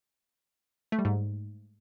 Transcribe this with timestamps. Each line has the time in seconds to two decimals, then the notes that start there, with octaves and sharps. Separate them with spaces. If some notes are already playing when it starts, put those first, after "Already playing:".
0.92 A3
0.99 G3
1.05 G#2